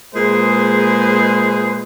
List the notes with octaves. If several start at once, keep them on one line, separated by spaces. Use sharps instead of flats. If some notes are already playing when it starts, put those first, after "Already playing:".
A#2 G#3 G#4 B4 C5